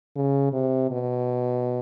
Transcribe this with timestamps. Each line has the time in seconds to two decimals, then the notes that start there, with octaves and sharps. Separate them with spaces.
0.16 C#3
0.53 C3
0.91 B2